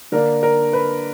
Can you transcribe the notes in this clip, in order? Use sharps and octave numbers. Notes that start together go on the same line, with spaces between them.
D3 A#3 D4 A#4
A#4
B4